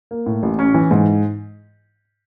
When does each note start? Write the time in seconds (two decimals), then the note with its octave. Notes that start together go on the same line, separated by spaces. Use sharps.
0.11 A#3
0.26 A2
0.43 A1
0.59 C#4
0.74 E3
0.91 G#2